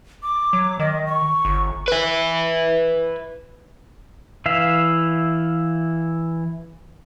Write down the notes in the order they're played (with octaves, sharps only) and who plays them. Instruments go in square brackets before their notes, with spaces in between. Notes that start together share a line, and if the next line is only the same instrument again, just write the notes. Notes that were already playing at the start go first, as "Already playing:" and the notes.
[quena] D6
[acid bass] F#3
[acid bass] D#3 [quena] D#5
[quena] C#6
[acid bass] G1
[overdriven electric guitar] B4 E5
[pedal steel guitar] E3 E5 F5